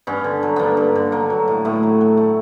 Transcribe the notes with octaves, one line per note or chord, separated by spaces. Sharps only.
G2 B3 C#4
D3
F#3
G2 A#3 B3
G2
D3
F#3 A#3
F#3
A2
A2 A3 B3
F#3
F#3
A3